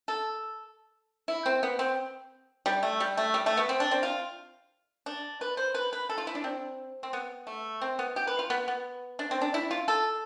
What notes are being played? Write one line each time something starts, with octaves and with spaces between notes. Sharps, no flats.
A4
E4
C4
B3
C4
G3
A3
G3
A3
G3
A3
B3
C4
D4
C4
F4
D4
B4
C5
B4
B4
A4
F4
E4
D4
C4
C4
B3
A3
C4
B3
G4
B4
F4
B3
B3
D4
C4
D4
E4
F4
A4